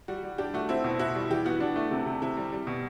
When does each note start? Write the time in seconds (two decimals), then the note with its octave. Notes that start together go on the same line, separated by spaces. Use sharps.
0.08 G3 F#4
0.23 G3
0.38 D4 G4
0.54 A3 F#4
0.69 C4 E4
0.84 B2
0.99 E4 F#4
1.15 G3
1.30 E3 G4
1.45 B3 F#4
1.60 D4
1.76 A3
1.91 C3
2.06 C3
2.22 C3 E4
2.37 G3
2.52 G3
2.67 B2